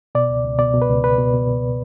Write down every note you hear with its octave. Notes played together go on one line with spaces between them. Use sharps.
B2 D5
C#2
C#2
B2 D5
B2
B4
C#2
C#2 B4
B2
B2
C#2